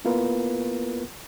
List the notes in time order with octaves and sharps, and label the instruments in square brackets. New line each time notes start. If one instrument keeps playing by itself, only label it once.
[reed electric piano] A#3 B3 E4 F4 A#4 B4